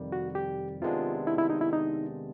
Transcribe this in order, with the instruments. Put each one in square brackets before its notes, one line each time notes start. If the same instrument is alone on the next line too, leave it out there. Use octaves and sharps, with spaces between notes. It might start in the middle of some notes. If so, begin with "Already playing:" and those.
Already playing: [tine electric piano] F2 C3 D#3 G3
[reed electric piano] F#4
G4
[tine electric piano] C3 D#3 G#3 B3 D4 [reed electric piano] F4
[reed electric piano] E4
E4
D#4
E4
D#4